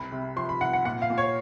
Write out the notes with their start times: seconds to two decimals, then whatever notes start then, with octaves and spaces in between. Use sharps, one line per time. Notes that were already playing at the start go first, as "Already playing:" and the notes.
Already playing: C2 B5
0.12 C3
0.36 F3 C6
0.49 B5
0.61 C2 F#5
0.73 F#5
0.85 A#2 F#5
1.02 F5
1.10 A#2
1.18 C#5